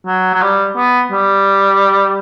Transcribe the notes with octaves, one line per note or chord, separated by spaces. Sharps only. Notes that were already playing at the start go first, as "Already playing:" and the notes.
F#3
F#3
G3
B3
G3